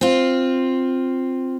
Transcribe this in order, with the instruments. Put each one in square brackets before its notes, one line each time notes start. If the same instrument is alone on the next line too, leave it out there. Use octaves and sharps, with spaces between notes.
[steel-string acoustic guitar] C4 F4